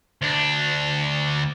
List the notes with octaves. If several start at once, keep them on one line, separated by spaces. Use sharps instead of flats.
D2 D4